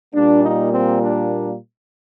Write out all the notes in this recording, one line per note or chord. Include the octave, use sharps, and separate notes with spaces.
A#2 G3 A#3 D4
D#4
C4
D4